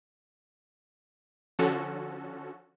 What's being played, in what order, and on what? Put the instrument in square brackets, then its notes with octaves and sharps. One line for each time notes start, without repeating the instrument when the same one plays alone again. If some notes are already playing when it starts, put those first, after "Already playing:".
[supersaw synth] D3 F3 C#4 F#4 A4